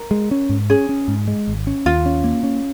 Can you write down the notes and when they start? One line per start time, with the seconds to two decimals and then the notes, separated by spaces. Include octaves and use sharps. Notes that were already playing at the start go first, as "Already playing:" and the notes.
Already playing: A#4
0.11 G#3
0.31 C#4
0.50 G#2
0.70 C#4 G#4
0.89 C#4
1.08 G#2
1.28 G#3
1.48 G#1
1.67 C#4
1.86 D#2 F4
2.06 C#4
2.24 A#3
2.43 C#4